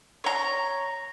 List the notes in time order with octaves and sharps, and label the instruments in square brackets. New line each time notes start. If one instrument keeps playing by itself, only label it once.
[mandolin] C#5 A#5